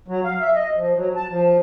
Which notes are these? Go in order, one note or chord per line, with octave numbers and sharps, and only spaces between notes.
F#3
F5
E5
D#5
F3
F#3
A5
F3